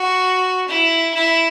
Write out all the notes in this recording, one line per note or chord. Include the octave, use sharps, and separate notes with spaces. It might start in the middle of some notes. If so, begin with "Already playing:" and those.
Already playing: F#4
E4
E4